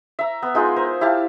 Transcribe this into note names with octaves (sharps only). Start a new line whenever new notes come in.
E5 A#5
B3
G#3 D#4 F4 G#4
A#4 C5
E4 G4 F5 A5